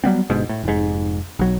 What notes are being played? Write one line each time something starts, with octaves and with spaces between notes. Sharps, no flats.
F#3 G3 B3 C4
G1 G#2 B2
A2
F1 G#2
B1 F#3